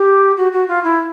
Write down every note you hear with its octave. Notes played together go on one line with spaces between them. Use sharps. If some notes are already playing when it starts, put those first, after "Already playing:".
Already playing: G4
F#4
F#4
F4
E4